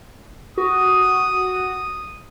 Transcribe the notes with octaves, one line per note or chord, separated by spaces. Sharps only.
F#4 D#6